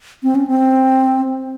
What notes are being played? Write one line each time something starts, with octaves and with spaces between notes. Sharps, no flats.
C4
C#4
C4